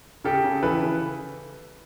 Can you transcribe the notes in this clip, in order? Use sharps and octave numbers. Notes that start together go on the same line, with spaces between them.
C#3 G4 A4
C#3
E3 A4 B4
C#3